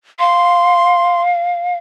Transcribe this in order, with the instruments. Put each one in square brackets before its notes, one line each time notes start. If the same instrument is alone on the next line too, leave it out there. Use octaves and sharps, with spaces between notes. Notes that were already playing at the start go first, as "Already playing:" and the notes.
[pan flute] F5 [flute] C6